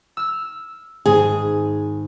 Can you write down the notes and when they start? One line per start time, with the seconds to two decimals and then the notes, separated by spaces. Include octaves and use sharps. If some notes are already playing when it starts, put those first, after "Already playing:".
0.17 E6 F6
1.06 G#1 G#2 G#3 G#4